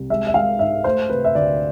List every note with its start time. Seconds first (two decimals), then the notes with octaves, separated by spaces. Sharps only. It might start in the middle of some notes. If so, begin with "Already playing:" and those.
Already playing: C2
0.10 G#3 E5
0.27 E5
0.34 G#3 F5
0.59 G#2 E5
0.84 A3 C5
1.10 C3 B4
1.25 E5
1.35 D2 D5